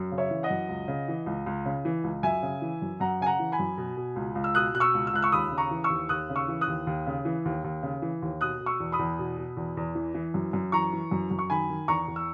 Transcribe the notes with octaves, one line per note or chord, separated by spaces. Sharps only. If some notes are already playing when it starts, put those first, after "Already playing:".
Already playing: F#2
C#3
C#5 E5
E3
D#5 F#5
F#2
C#2
C#3
E3
C#2
C#2
C#3
E3
C#2
F#2 E5 G#5
C#3
E3
F#2
F#2 F#5 A#5
C#3 G#5
F#5 A#5
E3
G#5 B5
F#2
B2
B2
C#2
C#2
E6
B2 D#6 F#6
B2 F#6
C#6 E6
C#2
E6
C#2 F#6
C#6 E6
D#2 B5 D#6
C#3
A#5 C#6
E3
C#6 E6
D#2
D#2 D#6 F#6
C#3
C#6 E6
E3
D#6 F#6
D#2
D#2
C#3
E3
D#2
D#2
C#3
E3
D#2
B2 D#6 F#6
B2
C#6 E6
E2
B5 D#6
E2
B2
B2
E2
E2
E3
E3
F#2
F#2
E3 A#5 C#6
E3
F#2
F#2
C#6
D#3 G#5 B5
D#3
E2 A#5 C#6
E2
E6